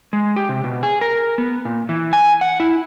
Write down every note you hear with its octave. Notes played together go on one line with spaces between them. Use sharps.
G#3
G4
C3
B2
G#4
A#4
B3
A#2
E3
G#5
F#5
E4